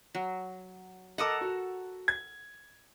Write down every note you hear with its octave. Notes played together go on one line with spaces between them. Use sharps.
F#3
A4 A#4 D#5 F#5 D6
F#4
G#6